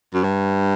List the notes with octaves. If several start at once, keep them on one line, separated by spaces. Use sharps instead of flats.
F#2
G2